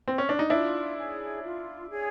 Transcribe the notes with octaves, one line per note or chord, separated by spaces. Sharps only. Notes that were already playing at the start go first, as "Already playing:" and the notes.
C4
C#4
D4
D#4
D4 E4 F4
G#4 C#5
F4
G#4 C#5